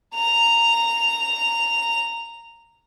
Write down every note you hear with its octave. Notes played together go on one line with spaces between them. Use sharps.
A#5 F7